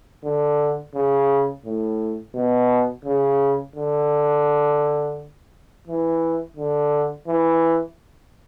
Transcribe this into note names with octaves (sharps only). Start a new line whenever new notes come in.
D3
C#3
A2
B2
C#3
D3
E3
D3
E3